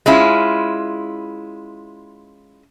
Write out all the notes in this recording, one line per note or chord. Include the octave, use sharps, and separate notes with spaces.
G#3 C#4 E4 F4